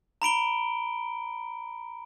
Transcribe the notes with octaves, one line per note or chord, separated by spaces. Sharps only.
A#5 B5 D7 G7